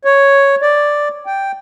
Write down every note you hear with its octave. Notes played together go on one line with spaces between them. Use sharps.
C#5
D5
G5